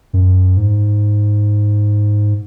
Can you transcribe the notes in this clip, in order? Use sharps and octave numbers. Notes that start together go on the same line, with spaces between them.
F#2
G#2